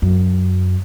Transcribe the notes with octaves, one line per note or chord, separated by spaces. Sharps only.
F#2